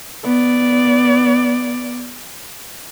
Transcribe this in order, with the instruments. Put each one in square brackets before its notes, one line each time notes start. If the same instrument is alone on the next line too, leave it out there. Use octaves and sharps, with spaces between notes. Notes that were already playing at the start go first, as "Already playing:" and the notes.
[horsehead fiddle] B3 D5